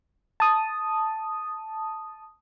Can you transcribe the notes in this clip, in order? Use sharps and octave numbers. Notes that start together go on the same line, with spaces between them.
A5 D#6